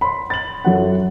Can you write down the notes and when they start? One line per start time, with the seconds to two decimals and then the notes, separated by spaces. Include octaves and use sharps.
0.01 B5 C6
0.30 A6 F#7
0.65 F#2 F#3 A4 F#5